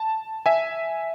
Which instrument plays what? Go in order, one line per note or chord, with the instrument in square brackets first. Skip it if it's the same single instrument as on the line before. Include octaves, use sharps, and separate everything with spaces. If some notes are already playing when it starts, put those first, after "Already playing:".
Already playing: [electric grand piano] A5
E5 G#5